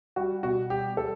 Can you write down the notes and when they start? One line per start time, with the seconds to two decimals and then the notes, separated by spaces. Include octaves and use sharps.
0.16 G3 F#4
0.43 B2 F#4
0.70 G3 G4
0.97 G3 A4